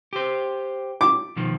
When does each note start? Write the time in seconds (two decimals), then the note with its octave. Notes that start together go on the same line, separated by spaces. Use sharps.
0.13 G4 C5
1.01 D6
1.36 B2 D#3 F3